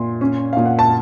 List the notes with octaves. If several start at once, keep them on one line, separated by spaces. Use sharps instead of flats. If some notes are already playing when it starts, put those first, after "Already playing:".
Already playing: A#2 C6
C#4
A#2 F5
F#5
A5